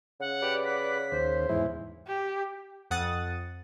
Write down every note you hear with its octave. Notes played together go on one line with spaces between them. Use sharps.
C#3 F#5
G4 B4 D5
F#5 B6
D#2 C5
E2 G#2 E4
G4
F2 F#5 D#6 A6